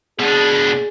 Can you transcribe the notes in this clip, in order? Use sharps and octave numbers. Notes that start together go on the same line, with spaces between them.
B2 D4 G#4